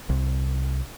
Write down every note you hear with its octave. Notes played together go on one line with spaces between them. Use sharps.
C2